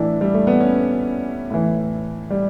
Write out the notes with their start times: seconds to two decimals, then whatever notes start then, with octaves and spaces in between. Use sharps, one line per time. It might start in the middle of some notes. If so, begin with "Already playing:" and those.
Already playing: A2 E3 D4 E4
0.21 G3
0.34 A3
0.47 B3
0.60 C#4
1.50 A2 E3
2.30 G3